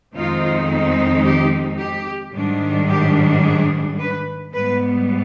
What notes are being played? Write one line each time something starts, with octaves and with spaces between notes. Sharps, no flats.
F2 D#3 G#3 C4 D#4 F4
G4
G4
G#2 D#3 G3 D4
G4
G#4
B4
G#2 G3 B3 B4